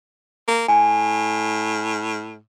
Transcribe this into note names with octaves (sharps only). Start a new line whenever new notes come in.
A#3
A2 G#5